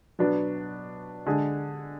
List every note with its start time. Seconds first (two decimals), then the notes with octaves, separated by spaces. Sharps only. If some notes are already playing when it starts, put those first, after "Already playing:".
0.19 B2 F#3 B3 D4
1.26 D3 G#3 D4 G#4